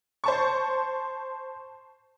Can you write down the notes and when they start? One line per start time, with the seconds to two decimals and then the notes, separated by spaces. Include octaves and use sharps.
0.24 C5 A5 C#6